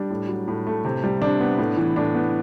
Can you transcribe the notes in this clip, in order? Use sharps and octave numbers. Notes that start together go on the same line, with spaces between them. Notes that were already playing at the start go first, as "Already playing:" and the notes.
Already playing: G3 D4
A2
F#3
A2
A3
C3
G3
C3 D4
B3
A2
E3
A2 D4
B3